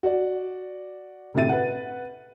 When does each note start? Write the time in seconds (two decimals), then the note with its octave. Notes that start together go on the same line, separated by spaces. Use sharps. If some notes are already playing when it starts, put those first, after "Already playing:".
0.03 F#4 D5
1.34 D2 A2 C3 E5 A6 D#7
1.49 B4 F#5